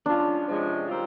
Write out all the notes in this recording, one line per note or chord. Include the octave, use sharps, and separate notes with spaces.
F3 G#3 C#4 D4 F4
C3 F3 G#3 C#4
D#3 G3 C4 F4